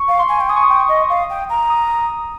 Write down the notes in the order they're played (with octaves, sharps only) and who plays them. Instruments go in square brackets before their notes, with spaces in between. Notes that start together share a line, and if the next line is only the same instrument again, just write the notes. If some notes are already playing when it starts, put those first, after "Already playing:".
Already playing: [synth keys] C#6
[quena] F5
[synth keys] C6
[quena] G#5
G5
[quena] G#5 [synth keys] D#6
[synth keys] C#6
D#6
[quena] G5
D#5
F5
G5
A#5
[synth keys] D#6